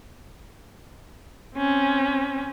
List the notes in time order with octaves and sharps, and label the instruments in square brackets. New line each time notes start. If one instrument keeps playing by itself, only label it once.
[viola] C4 C#4